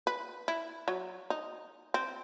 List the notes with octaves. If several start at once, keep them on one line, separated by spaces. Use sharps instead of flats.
B4
E4
F#3
D#4
C4